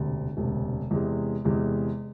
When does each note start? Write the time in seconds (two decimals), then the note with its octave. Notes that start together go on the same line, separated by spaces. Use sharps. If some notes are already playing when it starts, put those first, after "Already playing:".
Already playing: E1 D2 C3
0.37 E1 D2 C3
0.91 E2 C3 G#3
1.45 E2 C3 G#3